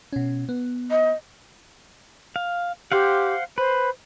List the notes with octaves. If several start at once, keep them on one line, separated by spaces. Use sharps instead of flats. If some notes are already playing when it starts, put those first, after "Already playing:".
B2 C#4
B3
D#5
F5
G4 C5 F5 F#5
B4 C5